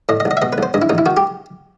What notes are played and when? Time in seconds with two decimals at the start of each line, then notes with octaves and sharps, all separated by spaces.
0.09 A2 D#5
0.20 D#5
0.25 B1
0.31 D#5
0.37 E5
0.42 B2 D#5
0.53 B4
0.58 B1 C5
0.74 G2 D#5
0.82 E4
0.89 A1 D#4
0.98 E4
1.06 D#3 F#4
1.17 G4